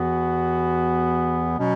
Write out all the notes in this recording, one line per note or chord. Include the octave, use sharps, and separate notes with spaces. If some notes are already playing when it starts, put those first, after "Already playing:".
Already playing: E2 E3 B3 F#4
B2 F#3 C#4